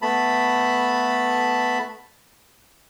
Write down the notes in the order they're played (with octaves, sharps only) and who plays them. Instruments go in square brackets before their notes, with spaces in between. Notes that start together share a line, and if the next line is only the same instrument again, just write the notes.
[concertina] A3 B3 A5 B5